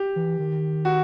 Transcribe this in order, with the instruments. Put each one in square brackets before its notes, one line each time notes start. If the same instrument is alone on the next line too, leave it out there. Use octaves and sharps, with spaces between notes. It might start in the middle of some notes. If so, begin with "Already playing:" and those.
Already playing: [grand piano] G4
[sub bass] E3
D#3
[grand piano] F#4